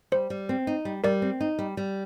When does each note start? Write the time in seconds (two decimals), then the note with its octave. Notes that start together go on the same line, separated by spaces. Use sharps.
0.12 G3 C5
0.30 G3
0.49 C4
0.67 D#4
0.85 G3
1.04 G3 A#4 D5
1.22 C4
1.40 D#4
1.59 G3
1.77 G3